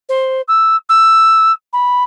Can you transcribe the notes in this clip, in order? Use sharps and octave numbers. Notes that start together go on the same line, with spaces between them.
C5
E6
E6
B5